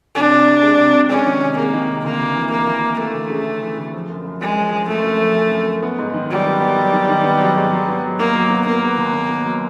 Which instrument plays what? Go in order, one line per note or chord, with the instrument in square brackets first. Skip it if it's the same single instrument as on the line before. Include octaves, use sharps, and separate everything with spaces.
[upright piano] C3 [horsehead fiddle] D4
[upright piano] C3
C3
G#3
C3
C3
[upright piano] G#3 [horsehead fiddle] C#4
[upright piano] D#3
C3
[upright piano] G#3 [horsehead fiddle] A#3
[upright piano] D#3
C3
[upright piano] D2 [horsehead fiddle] A#3
[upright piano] D2
E3
[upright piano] E3 [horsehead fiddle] A#3
[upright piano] E3
E3
[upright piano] E3 [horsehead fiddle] A3
[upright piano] D2
C#3
C#3
E3
D2
F3
F#2
F#2
[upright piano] F#2 [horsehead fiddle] G#3
[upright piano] F3
F3
[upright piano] F#2 [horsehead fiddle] A3
[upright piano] F#2
F3
F#2
F#2
F#2
B3
G#2
D#3
[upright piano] F#3 [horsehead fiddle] G3
[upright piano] B3
B3
F#3
D#3
D#3
B3
F#3
G#2
F#3
B3
F#3
[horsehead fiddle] A#3 [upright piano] B3
[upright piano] F#3
B3
[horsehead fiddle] A#3 [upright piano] B3
[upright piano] B3
D#2
B3
B3
F#3